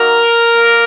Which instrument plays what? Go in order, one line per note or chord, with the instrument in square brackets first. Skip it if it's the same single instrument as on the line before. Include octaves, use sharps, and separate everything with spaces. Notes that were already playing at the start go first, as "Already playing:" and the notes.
Already playing: [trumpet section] A#3 D#4 F#4 A#4
A#3